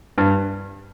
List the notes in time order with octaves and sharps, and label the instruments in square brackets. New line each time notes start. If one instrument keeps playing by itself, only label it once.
[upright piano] G2